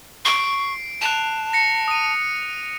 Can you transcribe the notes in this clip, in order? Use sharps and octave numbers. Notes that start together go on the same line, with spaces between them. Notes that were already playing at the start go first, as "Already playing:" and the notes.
C#6 C7 D7
A5 F#6 F7
A#6 C#7
D#6 D#7